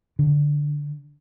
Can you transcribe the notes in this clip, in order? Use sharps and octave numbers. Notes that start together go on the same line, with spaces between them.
D3